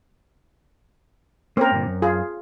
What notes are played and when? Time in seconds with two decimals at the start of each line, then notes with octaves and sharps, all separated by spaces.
1.57 A#3 C4 C#4 A#4
1.71 G2 A#2 D3
1.87 F#2
2.02 F4 G#4